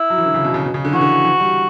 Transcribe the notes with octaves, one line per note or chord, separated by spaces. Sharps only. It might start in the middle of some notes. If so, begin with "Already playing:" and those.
Already playing: E4
F#3
E3
D3
C#3
B2
C#3
B2
C#3
D3
E3 F#4
D3
E3
G3